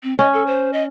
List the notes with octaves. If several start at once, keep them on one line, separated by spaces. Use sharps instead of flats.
C4
C#4 D#5
A4
C5
D#5